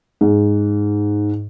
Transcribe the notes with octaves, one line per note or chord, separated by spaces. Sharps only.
G#2